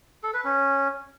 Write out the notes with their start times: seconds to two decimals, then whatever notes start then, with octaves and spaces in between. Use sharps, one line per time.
0.23 A4
0.34 B4
0.44 C#4